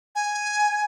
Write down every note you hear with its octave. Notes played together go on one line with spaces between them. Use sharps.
G#5